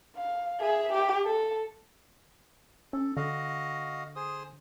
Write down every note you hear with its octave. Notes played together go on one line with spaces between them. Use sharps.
F5
G#4 E5
G4
A4
C#4 A4
D3 F#4 D#5 F5
G#4 C5 D#6